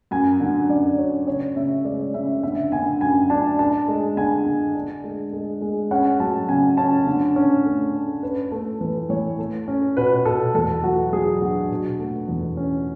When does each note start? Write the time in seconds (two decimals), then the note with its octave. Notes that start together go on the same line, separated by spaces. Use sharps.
0.11 F#2 G#5
0.40 D3
0.69 F#2 D5
0.98 F#2 C#5
1.27 C#3 C#5
1.56 C#3 E5
1.85 G#3 D5
2.14 C#3 E5
2.43 D3 E5
2.72 D3 G#5
3.01 F#2 G#5
3.30 D4 A5
3.59 D4 A5
3.88 G#3
4.17 D3 G#5
4.46 D3
4.75 D4
5.04 G#3
5.33 G#3
5.62 G#3
5.91 C#4 F#5
6.20 F#3 A5
6.49 C#3 G#5
6.77 C#4 A5
7.07 D3
7.36 C#4
7.65 A3
7.94 C#4
8.23 C#4 B4
8.51 A3 A4
8.81 E3 B4
9.10 E3 C#5
9.39 A3
9.68 C#4
9.97 B2 B4
10.25 B2 A4
10.55 E2 A4
10.83 F#3 F#4
11.13 F#3 G#4
11.42 D3 F#4
11.71 B2
12.00 A3
12.29 E2
12.57 C#4